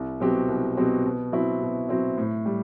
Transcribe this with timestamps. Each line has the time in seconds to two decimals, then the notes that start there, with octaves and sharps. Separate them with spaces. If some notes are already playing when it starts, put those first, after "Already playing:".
Already playing: C2
0.20 B2 F#3 C4 G4
0.48 C2
0.77 B2 F#3 C4 G4
1.04 B2
1.32 F#3 C4 E4
1.61 B2
1.89 F#3 C4 E4
2.18 A2
2.46 G3